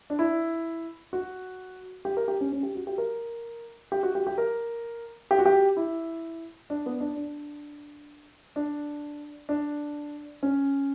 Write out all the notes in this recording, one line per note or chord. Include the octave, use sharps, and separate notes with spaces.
D4
E4
F#4
G4
A#4
G4
C#4
C#4
G4
F#4
G4
A#4
G4
F#4
G4
G4
A#4
G4
F#4
G4
E4
D4
B3
D4
D4
D4
D4
C#4